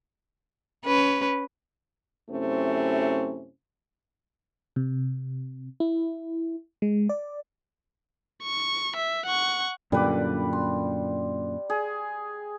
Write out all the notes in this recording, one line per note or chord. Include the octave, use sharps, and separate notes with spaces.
C#4 B4
F#2 C3 A3 C4 C#4 E4
C3
E4
G#3
D5
C#6
E5
F#5 C#6
F#2 A#2 D3 G3 B4 D6
C6
G#4